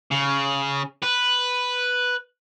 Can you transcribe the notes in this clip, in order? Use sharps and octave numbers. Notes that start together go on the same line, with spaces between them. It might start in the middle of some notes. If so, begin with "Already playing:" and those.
C#3
B4